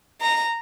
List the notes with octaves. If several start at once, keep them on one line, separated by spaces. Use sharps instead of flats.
A#5